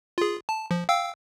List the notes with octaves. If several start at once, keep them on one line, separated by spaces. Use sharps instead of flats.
F4 G#4
A5
F3
F5 G5 E6